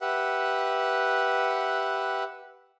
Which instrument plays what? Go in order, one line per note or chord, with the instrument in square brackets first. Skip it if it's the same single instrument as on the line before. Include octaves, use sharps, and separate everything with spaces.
[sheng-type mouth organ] G4 B4 E5 F#5